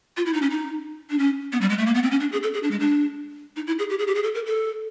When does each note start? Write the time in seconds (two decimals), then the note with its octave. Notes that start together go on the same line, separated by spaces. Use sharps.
0.17 F4
0.26 E4
0.34 D#4
0.42 C#4
0.50 D#4
1.10 D4
1.19 C#4
1.52 B3
1.61 G3
1.70 G#3
1.78 A3
1.86 A#3
1.95 B3
2.03 C4
2.11 C#4
2.20 D4
2.32 G#4
2.43 A4
2.54 G#4
2.63 D4
2.71 G#3
2.80 D4
3.56 D#4
3.67 E4
3.79 G#4
3.90 G4
3.99 G#4
4.07 G4
4.15 G#4
4.23 A4
4.35 A#4
4.46 A4